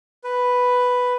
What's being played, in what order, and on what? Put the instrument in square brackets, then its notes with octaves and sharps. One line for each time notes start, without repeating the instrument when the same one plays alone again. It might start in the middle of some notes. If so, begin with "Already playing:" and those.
[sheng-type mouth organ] B4